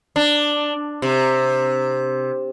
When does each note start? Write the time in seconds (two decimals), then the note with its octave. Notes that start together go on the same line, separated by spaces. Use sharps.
0.16 D4
1.02 C3